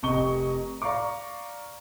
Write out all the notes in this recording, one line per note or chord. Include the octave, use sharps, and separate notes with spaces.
F1 C3 D#5 C#6 G7
D5 F5 A#5 C#6 D6